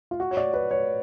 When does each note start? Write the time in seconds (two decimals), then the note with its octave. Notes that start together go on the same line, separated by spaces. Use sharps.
0.11 F4
0.20 F#4
0.31 C#5
0.37 D5
0.54 B4
0.71 C#5